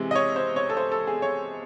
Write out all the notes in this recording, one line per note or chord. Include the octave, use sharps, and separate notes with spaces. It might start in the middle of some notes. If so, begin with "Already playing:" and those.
Already playing: C3 E3 G#3
D#5
C#5
C5
C#5
A4
C5
A4
G#4
C#5